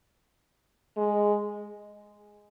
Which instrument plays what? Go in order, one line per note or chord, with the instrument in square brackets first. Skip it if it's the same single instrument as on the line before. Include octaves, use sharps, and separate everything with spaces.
[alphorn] G#3